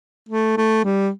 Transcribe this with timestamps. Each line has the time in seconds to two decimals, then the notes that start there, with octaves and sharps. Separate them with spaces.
0.29 A3
0.57 A3
0.84 G3